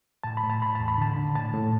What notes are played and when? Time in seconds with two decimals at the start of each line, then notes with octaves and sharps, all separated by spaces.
0.23 A2 A5
0.37 B5
0.43 A2
0.50 A5
0.61 A2 B5
0.75 E2 A5
0.88 B5
0.98 D3 A5
1.16 D3
1.35 A2 A5
1.54 A2